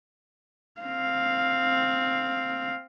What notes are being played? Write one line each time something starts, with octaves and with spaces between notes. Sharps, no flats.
C4 F5